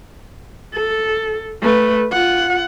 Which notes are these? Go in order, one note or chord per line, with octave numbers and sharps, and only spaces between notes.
A4
A3 B4
F4 F#5